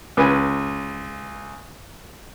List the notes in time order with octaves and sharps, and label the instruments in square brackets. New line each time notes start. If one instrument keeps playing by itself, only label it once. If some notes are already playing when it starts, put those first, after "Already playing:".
[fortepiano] C#2 B4 G#5